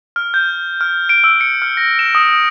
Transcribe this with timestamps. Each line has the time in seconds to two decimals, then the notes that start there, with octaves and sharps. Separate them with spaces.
0.16 F6
0.34 G6
0.81 F6
1.09 D7
1.24 E6
1.41 C#7
1.62 F6
1.77 A#6
1.99 E7
2.15 D#6